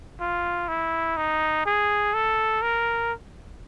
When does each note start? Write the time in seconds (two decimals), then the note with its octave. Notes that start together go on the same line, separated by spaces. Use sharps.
0.21 F4
0.68 E4
1.17 D#4
1.66 G#4
2.14 A4
2.62 A#4